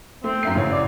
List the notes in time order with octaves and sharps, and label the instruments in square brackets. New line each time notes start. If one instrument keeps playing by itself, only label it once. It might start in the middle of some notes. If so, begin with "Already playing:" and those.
[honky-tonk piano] A3 [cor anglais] C4
[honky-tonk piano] F#2 E5 C7
A1 C#3 C#5
[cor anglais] D5